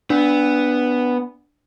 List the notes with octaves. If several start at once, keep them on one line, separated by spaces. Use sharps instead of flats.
B3 D4